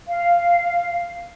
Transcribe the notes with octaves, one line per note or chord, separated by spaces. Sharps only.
F5